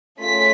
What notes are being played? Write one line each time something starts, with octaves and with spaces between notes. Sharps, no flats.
A3 C#4 F4 G#4 B6